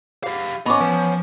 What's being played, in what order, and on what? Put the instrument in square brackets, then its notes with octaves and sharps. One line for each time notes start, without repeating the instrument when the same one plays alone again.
[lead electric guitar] G4 F5 [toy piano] G#4 C5 F#5
[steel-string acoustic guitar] B3 C#4 [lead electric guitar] D#5 [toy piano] B5 C#6 D6
[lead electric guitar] F3 [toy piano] B4 G#5